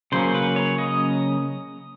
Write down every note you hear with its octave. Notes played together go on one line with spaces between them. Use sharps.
C#3 F#3 A#3 C#4 C5
B4
C#5
D#5